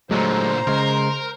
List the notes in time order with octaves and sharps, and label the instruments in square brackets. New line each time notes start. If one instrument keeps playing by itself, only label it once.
[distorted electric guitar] A#2 D3 [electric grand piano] F#3 G#3 A3 [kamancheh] C5 A#5
[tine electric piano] C#3 G#3 [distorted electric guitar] A#4 [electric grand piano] C6